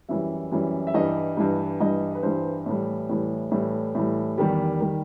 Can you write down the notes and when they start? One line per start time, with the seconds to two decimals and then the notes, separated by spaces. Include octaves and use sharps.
0.09 F#2 E3 G3 E5
0.52 F#2 E3 G3
0.87 E5
0.94 G2 E3 G3 D#5
1.37 G2 E3 G3
1.80 G2 E3 G3 D#5
2.15 B4
2.23 G2 E3 G3 C5
2.66 A2 E3 G3
3.09 A2 E3 G3
3.51 A2 E3 G3 A4
3.95 A2 E3 G3
4.38 E2 D#3 G3 G4
4.81 D#3 G3